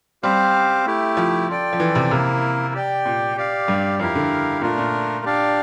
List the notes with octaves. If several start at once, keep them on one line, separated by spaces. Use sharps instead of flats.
G3 C4 G4 C5 F5
A3 E4 G4
F3
F4 A4 D5 G5
F3
E3
C3
C3 A#3 E4 A#4
G4 D5 G5
A#2
G4 D5 F5
G2
F2 E4 G4 A#4 F5
D3
A#2 A3 D4 F4 A#4
A#2
D4 G4 D5 F5